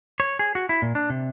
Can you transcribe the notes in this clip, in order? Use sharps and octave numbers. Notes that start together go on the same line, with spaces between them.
C#5
G#4
F#4
E4
A#2
D4
C3